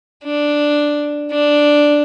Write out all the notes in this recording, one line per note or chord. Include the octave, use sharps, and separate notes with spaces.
D4
D4